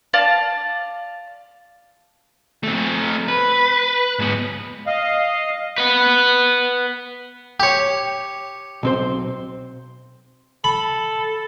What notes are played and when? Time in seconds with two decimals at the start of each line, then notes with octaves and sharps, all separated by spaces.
0.13 D5 F5 A5
2.63 A3 C4
3.28 B4
4.19 G#2 B3
4.87 D#5 F5
5.78 B4 F#5
7.60 G4 C#5
8.83 B1 C4 C5
10.64 A4 B5